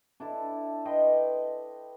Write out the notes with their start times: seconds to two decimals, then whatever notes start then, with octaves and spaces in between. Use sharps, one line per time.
0.20 D4 E4 A4
0.85 B4 D#5 G5 C6